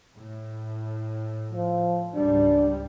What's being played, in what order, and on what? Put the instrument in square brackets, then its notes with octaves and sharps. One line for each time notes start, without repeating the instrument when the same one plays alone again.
[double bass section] A2
[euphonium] F3
[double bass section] C#2 G#2 G3 [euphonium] D4